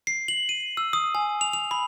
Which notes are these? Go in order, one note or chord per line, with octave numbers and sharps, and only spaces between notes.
C7
F#7
D#7
E6
D#6
G#5
F7
F7
B5